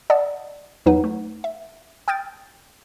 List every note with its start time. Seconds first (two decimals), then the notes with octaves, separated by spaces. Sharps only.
0.10 D5 D#5 F#5 A5 D#6
0.86 E2 F#3 D#4 B4 F#5
1.04 A3
1.44 E5
2.08 G5 D#6 F6 G6 A6 D7